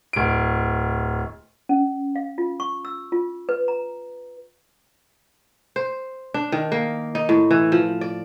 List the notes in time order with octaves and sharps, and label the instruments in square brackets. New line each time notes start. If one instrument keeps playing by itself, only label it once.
[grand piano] D1 D7
[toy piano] C#4
F5
F4
C#6
E6
F4
B4
A#5
[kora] C5
D4
D#3
A#3
D#4
A2
E3
F3
D5